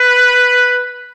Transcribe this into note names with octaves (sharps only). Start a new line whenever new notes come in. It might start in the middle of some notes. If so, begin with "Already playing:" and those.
Already playing: B4